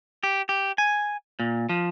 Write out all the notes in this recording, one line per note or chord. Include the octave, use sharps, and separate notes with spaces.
G4
G4
G#5
A#2
F3